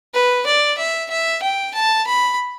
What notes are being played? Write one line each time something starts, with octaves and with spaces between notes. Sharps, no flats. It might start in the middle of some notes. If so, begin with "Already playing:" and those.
B4
D5
E5
E5
G5
A5
B5